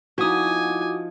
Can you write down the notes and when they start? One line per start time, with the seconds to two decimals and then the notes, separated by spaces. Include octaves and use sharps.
0.18 F3 D#4 E4 F#4 F#5 G#5 D6 D#6